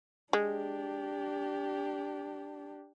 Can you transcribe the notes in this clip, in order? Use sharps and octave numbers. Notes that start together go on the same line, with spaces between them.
G#3 D4 G4